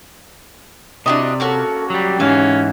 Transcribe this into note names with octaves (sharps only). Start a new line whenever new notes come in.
C3 D4 E4 F#4 D5 D#5
A#3 C#4 F#4 A4
F#3 G3 G4
G#2 E3 C#4 F5